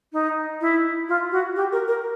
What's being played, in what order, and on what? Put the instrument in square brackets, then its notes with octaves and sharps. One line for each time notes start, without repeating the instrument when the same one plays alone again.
[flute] D#4
E4
F4
F#4
G4
A#4
A#4